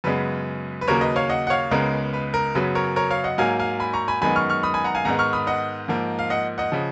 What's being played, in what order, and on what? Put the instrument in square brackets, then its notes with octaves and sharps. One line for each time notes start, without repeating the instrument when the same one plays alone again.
[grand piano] F#2 C#3 G#3 B3 B4
B4
D#2 C#3 F#3 A#3 A#4 C#5
B4 D#5
C#5 F5
D#5 F#5
F#5
C#5 F5
C#2 C#3 G#3 B3 A#4
B4
A#4
F#2 C#3 F#3 B3 B4
A#4 C#5
A#4 C#5
C#5 F5
D#5 F#5
G#2 F#3 A#3 F5 G#5
F5 G#5
G#5 B5
A#5 C#6
G#5 B5
F#2 D#3 G#3 B3 G#5 B5
C#6 F6
C#6 F6
B5 D#6
G#5 B5
F#5 A#5
F5 G#5
G#2 D#3 G#3 B3 F#5 A#5
C#6 F6
B5 D#6
D#5 F#5
G#2 F3 A#3
F5
D#5 F#5
D#5 F#5
C#3 F3